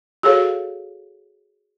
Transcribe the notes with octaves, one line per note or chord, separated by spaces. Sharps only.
F#4 G#4 A4 C#5 F5